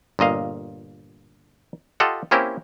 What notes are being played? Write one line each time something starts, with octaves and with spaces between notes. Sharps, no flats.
G1 A#2 D#5 F5
F4 G4 A4 D#5 F#5
A#3 C4 C#4 E4 G4 A#4